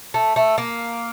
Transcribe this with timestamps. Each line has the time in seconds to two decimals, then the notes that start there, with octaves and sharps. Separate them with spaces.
0.14 A3
0.36 A3
0.58 A#3